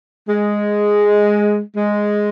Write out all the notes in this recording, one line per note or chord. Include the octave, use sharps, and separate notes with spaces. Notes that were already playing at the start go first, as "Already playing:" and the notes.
G#3
G#3